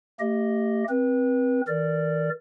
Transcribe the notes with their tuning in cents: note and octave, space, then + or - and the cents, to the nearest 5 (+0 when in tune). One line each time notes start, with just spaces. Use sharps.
A3 +40 G4 +0 D#5 +0
C4 +0 B4 -30
E3 -45 A#4 -25 D5 +0